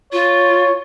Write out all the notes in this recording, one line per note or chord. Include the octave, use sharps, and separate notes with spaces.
F4 C#5